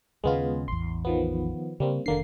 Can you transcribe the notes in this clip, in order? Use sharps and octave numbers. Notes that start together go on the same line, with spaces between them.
D#2 C#3 G#3 B3 F4
A1 E2 C6
D#3 F3 B3
C#3 G3 A#3 C4
F1 D3 D#3 A#3 D4 C7